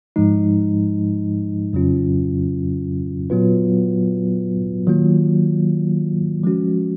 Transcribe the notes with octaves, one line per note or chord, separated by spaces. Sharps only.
G#2 F3 G#3 D#4
F2 C#3 F#3 C#4 F4
A#2 F#3 B3 F4 B4
D#3 F#3 A#3 F4
F3 G#3 C#4 F#4